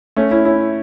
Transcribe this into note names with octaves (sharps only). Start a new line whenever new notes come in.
A3 C#4
C#4 E4
C#4 E4